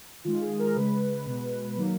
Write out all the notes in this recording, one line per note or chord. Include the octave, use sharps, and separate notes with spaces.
D#3 G#3 F4
G#4
A#4
C#3 G#3 B4
B2 G#3
D#3 F#3 A#3